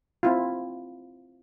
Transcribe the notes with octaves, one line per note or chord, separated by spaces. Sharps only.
C4 E4 F4